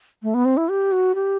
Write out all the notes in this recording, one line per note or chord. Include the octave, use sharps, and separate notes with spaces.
A3
B3
C4
E4
G4
F#4
G4